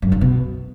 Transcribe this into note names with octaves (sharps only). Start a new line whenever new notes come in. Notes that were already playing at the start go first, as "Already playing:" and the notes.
F#2
G2
B2